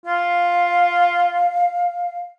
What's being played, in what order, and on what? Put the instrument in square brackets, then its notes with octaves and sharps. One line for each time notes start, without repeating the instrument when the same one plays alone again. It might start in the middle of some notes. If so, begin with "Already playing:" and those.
[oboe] F4 [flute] F5